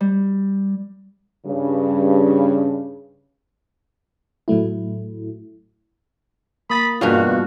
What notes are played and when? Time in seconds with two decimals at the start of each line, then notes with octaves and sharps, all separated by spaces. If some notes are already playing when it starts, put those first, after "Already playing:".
0.01 G3
1.46 G2 C#3
4.48 A2 F#3 A3 E4
6.70 A#3 B5 D#6 A6 B6
7.01 E2 G2 B2 A#3 F4 F#4 A#4 F5